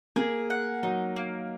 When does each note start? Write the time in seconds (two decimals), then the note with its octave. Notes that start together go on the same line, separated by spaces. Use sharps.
0.16 A#3 G#4
0.50 F#5
0.83 F#3 D#4
1.16 A#3